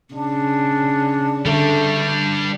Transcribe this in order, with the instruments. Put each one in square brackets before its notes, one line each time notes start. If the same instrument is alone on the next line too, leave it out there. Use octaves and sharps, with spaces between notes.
[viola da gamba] C#3 [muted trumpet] D4
[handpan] D3 [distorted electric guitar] G3 D4 [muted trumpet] A3